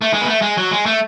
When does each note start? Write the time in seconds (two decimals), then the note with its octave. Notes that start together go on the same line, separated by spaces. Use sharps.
0.02 A3
0.13 G#3
0.21 B3
0.28 A3
0.42 G#3
0.57 F#3
0.71 G#3
0.86 A3